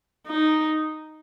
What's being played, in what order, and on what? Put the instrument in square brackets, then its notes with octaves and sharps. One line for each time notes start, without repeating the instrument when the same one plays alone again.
[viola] D#4